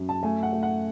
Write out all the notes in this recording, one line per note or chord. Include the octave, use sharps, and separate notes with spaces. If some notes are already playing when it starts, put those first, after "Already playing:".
Already playing: F#2
A5
A3 G#5
F#5
A3
F#5